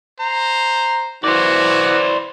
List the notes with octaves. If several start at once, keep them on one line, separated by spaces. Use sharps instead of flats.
C5 A#5
E3 F#4 C5 D5